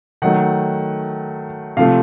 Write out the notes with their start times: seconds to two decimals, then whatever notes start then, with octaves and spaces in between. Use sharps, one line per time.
0.22 D#3 F#3 A3 F#5
1.77 C3 F3 A3 F5